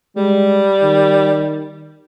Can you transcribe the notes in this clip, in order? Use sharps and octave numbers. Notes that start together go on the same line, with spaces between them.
G3 G#3
D#3